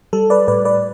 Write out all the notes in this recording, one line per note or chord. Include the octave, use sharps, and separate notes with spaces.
G3 A4
B4 D5
A2 B4 D5
B4 D5